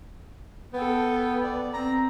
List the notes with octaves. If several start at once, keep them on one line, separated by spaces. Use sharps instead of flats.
B3 A4 G5
D5
C4 A#5